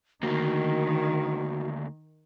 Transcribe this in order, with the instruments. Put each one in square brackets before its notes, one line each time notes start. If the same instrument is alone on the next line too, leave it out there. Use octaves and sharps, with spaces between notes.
[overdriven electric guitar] D2 A#3 [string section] D#3 [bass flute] F#4